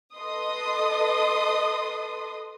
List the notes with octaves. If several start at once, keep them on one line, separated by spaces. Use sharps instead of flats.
A4 B4 D#5 C6 D#6